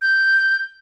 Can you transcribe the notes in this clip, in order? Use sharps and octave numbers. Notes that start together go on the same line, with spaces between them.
G6